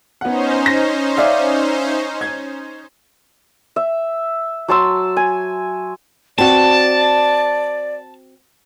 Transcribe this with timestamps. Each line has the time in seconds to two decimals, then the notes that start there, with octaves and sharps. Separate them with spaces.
0.21 B3 C#4 D#4 C5 F#5
0.66 A#6
1.17 D5 E5 F5
2.21 G#6
3.76 E5
4.68 F#3 A5 C6 E6
5.17 G#5
6.38 C4 F#4 D5 A5